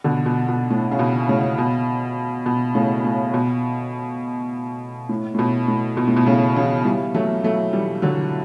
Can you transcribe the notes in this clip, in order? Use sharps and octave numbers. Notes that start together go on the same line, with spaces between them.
B2 D3
B2
B2
A2
C#3
B2
A2 C#3
B2
B2
A2 C#3
A2
B2
A2
A2
B2
A2
B2
A2
B2
A2 C#3
C#3 E3
E3 G3
F#3 A3
F#3 A3
E3 G3
D3 F#3